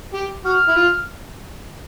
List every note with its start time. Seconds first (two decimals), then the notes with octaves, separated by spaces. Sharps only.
0.14 G4
0.45 F#4 F6
0.68 E4
0.76 F4